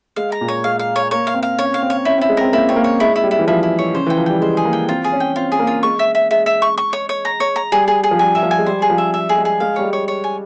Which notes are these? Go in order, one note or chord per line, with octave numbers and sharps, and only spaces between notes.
G#3 F5
A#5
A#2
C#5
G#3 F5
F5
C#5
A#3 C#5
F5
C4
F5
C#4 C#5
F5
C4
C#5
C#4 E4
C4
E4
G#3
C4 A#4
A#3 E4
C4 C#5
A#3
C#5
G#3 E4
E4
G3
E4
E3
F3 E4
E4
C#5
C#3 C5
E3
G5
F3
G3 G5
G#3 C5
G#4
A#3
G5
C4 F4
G#4
C#4
G5
C4 F4
G#4
A#3
F4
G#3 C#6
E5
E5
G#3 E5
E5
C#6
C#6
C#5
C#5
A#5
C#5
A#5
G3 G#4
G#4
G#4
F3
G3 G#5
E5
F3
G#5
G#3
G3 C5
G#4
F3
E5
E5
G#4
G#3
G#4
G#3 F5
G3 C#5
G#3
C#5
C#5
G#5